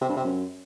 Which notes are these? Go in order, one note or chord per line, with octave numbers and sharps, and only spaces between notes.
C3
G2
C3
F#2